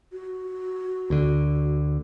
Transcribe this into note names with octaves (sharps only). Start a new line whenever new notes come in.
F#4
D2 D3